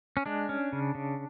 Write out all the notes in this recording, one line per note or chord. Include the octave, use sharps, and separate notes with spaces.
C#4
G#3 D4
C#4
C#3
C#3